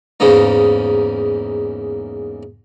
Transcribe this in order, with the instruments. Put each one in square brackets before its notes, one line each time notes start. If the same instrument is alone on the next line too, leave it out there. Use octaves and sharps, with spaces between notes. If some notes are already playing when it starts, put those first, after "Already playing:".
[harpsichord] E2 G#2 C#3 A#3 D#4